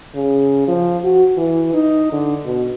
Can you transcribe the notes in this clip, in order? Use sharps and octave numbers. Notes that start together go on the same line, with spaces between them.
C#3
F3
F#4
E3
D#4
D3
B2